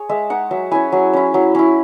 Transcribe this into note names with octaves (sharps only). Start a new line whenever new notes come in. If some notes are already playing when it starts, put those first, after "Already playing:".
Already playing: G#4 C#5
G#3 E5
D#4 F#5
F#3 E5
C#4 E4 G#5
F#3
C#4 E4
F#3
C#4 E4